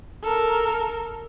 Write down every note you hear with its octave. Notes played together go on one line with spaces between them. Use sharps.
A4 A#4